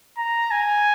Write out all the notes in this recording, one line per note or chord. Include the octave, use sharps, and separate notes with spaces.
A#5
G#5